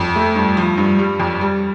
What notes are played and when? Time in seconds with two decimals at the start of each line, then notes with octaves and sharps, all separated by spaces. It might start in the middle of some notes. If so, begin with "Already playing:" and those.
Already playing: F2
0.15 A3
0.36 G2
0.57 F3
0.78 G2
0.99 G3
1.20 F2
1.41 G3